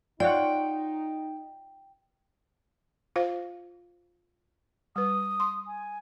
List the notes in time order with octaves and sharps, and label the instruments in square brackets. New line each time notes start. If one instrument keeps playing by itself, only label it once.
[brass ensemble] D#4 [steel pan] F4 C#5 F#5 [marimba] D5 [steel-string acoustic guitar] G5
[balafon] F4 C5 F5
[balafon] G3 B4 [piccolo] D#6
[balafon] C6
[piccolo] G#5